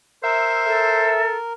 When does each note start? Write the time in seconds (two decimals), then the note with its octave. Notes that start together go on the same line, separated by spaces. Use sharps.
0.23 A#4 C5 E5
0.66 A4 E5